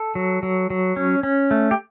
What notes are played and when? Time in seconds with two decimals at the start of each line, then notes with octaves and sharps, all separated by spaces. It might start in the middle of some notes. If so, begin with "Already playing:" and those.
Already playing: A4
0.15 F#3
0.43 F#3
0.70 F#3
0.96 C#4
1.23 C#4
1.51 A3
1.71 G4